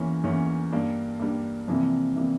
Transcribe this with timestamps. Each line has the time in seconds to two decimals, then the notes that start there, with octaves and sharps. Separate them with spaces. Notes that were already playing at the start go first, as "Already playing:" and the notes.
Already playing: E2 E3 A#3 C#4
0.24 E2 E3 A#3 C#4
0.72 G2 G3 A#3
1.20 G2 G3 A#3
1.68 F2 C3 E3 G3 A#3
2.16 C3 E3 G3 A#3